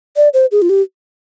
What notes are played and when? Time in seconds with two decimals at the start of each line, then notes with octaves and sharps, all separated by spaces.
0.16 D5
0.34 C5
0.52 G#4
0.62 F4
0.69 G4